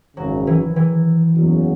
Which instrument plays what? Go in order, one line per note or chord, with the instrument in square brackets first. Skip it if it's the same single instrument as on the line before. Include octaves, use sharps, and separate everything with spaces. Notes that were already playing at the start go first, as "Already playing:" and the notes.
[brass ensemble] G#1 F#2 C#3 [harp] F#3
[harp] E3
E3
[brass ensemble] F#1 E2 C#3 F#3